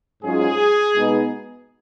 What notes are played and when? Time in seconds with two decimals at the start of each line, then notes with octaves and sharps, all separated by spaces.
0.23 G#2 F#3 C#4 F4 G#4
0.95 B2 G#3 B3 D#4